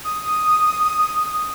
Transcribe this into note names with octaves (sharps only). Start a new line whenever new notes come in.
D#6